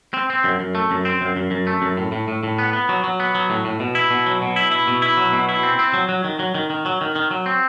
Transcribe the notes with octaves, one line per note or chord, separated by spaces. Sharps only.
C4
C4
F#2
F#2
A3
F#2
C4
F#2
F#2
F#2
A3
F#2
A2
A2
A2
A2
B3
B3
F#3
F#3
B3
F#3
A2
A2
B2
E4
B2
F#3
B2
E4
E4
B2
E4
F#3
B2
E4
C4
C4
F#3
F#3
D#3
F#3
D#3
D#3
F#3
D#3
D#3
F#3
C4